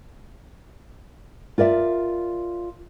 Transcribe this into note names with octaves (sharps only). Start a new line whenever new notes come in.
F4 A#4 D5 E5